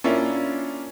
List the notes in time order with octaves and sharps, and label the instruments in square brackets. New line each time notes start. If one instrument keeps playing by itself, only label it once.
[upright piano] A#3 C#4 D4 E4 F4